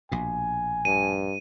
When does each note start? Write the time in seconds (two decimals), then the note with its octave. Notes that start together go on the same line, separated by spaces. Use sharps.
0.12 A#1 B2 G#5
0.85 G2 D#7